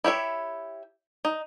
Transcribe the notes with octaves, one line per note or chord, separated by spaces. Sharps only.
E4 G4 C#5 E5
D#4